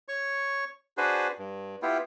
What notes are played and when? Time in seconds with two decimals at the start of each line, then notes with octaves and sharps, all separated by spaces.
0.08 C#5 C#6
0.97 D4 F#4 G#4 B4 C5
1.39 G2
1.82 B3 E4 F4 G4